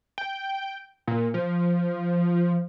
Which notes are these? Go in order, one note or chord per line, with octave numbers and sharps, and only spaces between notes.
G5
A#2
F3